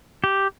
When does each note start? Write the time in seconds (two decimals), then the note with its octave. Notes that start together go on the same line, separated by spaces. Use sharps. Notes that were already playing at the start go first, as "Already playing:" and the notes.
0.24 G4